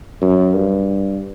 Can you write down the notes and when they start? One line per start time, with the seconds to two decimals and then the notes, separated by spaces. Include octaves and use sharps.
0.21 F#2
0.54 G2